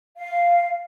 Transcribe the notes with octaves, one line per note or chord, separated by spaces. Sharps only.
F5